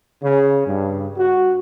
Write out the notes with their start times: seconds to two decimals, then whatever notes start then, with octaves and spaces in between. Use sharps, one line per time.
0.23 C#3
0.67 G2
1.18 F#4